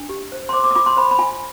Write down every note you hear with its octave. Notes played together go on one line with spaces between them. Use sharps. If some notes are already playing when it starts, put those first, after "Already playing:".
Already playing: D4
G4
C5
C6
C5 D6
D6
D#6
F4 D6
C6
C5 B5
B5
F4 G#5